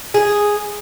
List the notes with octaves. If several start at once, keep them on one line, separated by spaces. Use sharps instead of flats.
G#4